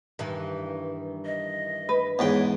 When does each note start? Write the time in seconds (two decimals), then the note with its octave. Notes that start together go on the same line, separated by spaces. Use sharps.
0.19 G2 D#3 E3
1.26 D#5
1.89 B4
2.19 E2 G#2 C#5 G5